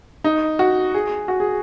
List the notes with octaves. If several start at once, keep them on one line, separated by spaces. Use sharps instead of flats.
D#4
F#4
G#4
F#4
G#4